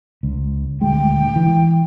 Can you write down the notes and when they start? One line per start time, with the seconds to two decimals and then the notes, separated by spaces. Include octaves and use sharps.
0.23 C#2
0.81 D#1 D2 G#3 G5
1.36 E3